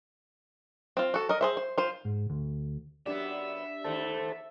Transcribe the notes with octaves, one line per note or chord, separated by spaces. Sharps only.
C4 F4
F#4 A4
A#4 D#5
G#4 C5 E5
C5
F4 C5
G#2
D2
F#2 B3 D4 G4 D5 E5
D#2 D3 A3 A4 C5 A5